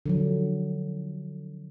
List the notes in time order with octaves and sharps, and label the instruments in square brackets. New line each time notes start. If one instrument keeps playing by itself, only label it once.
[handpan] D3 F3 F#3